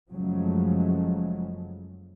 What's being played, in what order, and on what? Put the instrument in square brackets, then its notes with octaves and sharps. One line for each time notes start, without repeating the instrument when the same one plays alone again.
[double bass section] F#1 C#3 F3 F#3 G#3 A3